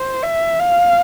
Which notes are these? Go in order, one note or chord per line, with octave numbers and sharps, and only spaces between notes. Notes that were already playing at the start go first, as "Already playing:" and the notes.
Already playing: C5
E5
F5